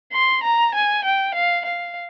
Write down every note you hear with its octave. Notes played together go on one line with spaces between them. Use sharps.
C6
A#5
G#5
G5
F5
F5